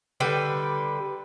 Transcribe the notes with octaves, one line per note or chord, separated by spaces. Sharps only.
D3 G3 B4 G5